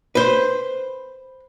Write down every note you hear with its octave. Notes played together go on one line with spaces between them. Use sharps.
B4 C5